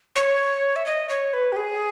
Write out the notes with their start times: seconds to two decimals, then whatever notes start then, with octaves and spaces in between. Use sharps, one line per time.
0.16 C#5
0.76 E5
0.86 D#5
1.09 C#5
1.33 B4
1.52 G4
1.56 G#4